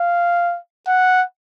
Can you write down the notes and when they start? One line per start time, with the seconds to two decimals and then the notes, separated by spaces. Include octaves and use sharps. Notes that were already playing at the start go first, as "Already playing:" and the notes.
Already playing: F5
0.88 F#5